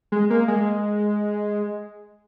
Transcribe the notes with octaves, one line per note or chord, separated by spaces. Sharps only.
G#3
A#3
G#3